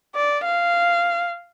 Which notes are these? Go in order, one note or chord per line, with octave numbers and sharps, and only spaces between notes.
D5
F5